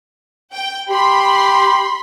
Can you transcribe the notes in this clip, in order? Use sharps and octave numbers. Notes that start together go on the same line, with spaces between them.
G5
G4 B5 C6